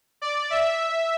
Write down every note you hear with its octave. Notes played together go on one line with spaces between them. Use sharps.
D5
E5